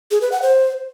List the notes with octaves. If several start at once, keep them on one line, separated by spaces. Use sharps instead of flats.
G#4
B4
F#5
C5